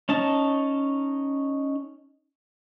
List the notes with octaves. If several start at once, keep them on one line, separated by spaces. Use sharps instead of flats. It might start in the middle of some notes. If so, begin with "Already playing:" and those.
C#4 D#4 A5